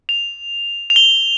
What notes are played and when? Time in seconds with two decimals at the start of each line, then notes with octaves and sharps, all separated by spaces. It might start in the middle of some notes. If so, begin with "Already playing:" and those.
0.09 F7
0.90 F7
0.96 G7